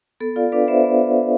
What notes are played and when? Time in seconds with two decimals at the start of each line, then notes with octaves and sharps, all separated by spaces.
0.20 B3 A4
0.36 F4 D5 F5
0.52 D4 B4 D5
0.61 F5
0.68 B3 C5 E5
0.84 B3